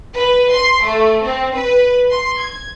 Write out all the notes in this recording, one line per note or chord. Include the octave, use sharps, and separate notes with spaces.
B4
C6
A3
C4
B4
C6
G#6